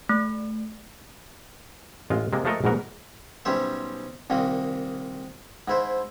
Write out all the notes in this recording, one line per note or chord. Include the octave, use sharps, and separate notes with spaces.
A3
A1 G#3 F4
C3 G#3 A#3
F3 G#3 A3 A4 A#4 D#5
A#1 G#2 B2 A#4 F#5
B1 G3 C#4 C5 E5
C2 A#2 D#3 A#3
G#2 E4 C5